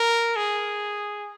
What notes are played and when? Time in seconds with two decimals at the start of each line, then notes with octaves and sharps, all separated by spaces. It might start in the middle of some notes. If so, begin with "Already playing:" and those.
Already playing: A#4
0.36 G#4